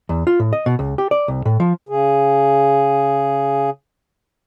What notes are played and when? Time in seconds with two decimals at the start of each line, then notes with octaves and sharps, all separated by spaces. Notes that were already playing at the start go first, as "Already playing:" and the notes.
0.09 E2
0.27 F4
0.40 A2
0.53 D#5
0.66 B2
0.79 C#2
0.98 G4
1.11 D5
1.28 C2
1.45 A2
1.60 F3
1.89 C#3 G#4